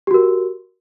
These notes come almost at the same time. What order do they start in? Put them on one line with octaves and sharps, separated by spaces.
G4 F#4 A#4